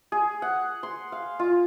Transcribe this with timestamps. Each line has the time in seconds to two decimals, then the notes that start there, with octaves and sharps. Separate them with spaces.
0.12 G#4
0.42 F#5
0.83 C6
1.12 F5
1.39 F4